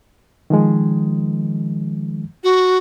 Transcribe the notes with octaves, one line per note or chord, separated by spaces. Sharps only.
D#3 F3 G#3
F#4